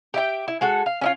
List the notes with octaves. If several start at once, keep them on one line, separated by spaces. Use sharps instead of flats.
G4 E5 G5
E4
G#3 F#4 A4
F5
C#4 E4 F4